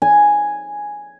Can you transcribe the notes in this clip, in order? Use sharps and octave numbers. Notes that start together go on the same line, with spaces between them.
G#5